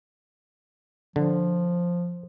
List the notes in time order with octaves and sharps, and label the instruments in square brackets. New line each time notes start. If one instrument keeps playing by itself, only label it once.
[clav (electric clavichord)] D3 [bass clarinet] F3